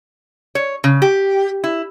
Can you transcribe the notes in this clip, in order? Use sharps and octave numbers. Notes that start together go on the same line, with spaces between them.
C#5
C#3
G4
E4